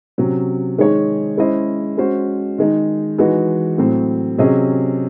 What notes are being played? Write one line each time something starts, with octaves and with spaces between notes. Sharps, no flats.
C3 F#3 C#4
D#3 G#3 D#4 G#4 C#5
G#3 C#4 E4 C5 D#5
G#3 C#4 F#4 C5
D#3 G#3 D#4
E3 G#3 D#4 F#4
A2 F#3 C4
C3 F#3 C#4 G#4 D#5